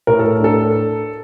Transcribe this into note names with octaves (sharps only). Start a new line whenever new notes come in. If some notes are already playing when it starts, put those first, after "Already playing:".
A2 A#4
A4
D4 A4